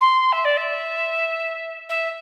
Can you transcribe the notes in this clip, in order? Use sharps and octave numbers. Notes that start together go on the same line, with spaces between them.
C6
E5
D5
E5
E5